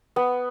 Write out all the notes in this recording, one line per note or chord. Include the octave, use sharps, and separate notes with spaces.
B3